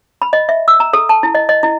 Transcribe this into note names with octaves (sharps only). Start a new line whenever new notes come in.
B5
D#5
E5
E6
A#5
A4
A5
E4
D#5
D#5
E4